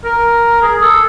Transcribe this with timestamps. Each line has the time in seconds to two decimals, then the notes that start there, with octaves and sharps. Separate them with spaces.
0.05 A#4
0.62 G#4
0.82 A4